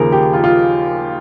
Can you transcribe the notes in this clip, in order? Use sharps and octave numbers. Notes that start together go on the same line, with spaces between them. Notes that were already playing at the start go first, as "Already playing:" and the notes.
Already playing: D#2 C#3 F3 G#4 A#4
G4
F4
F4